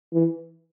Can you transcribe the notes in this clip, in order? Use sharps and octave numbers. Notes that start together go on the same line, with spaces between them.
E3